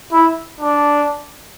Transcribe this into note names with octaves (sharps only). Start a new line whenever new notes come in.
E4
D4